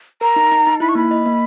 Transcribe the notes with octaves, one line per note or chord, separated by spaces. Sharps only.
A#4 A#5
D#4
D#4
D#4
E4 B5
C#6
A#3 B5
D#5
A#3